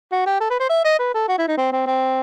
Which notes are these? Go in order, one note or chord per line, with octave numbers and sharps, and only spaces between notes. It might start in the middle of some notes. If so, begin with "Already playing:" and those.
F#4
G4
A4
B4
C5
E5
D#5
B4
A4
F#4
E4
D#4
C4
C4
C4